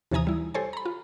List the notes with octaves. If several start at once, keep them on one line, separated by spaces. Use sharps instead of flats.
D#2 C3 E3 G#5 A#5 D#6
G3 E4
G4 A4 C5 C#5 G#5
A#5 B5
F4